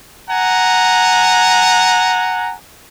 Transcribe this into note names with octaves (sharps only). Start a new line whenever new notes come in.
F#5 G#5 A#5